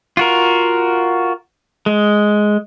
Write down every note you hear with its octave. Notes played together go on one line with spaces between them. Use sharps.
F4 F#4 A#4
G#3